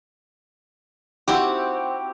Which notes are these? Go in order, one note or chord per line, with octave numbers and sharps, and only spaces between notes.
C4 E4 F#4 G4